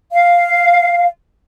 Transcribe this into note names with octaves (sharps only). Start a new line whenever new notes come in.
F5